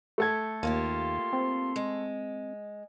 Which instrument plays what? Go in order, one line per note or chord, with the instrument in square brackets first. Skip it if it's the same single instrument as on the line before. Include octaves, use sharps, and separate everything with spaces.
[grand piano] A3 A4 G#6
[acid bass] D#2 [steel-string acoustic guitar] A#3 F4 G4 [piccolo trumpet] C6
[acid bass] C4
[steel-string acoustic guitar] G#3